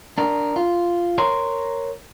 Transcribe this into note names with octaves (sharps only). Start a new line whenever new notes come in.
D4 A#4
F4
A#4 C#5 A#5 C6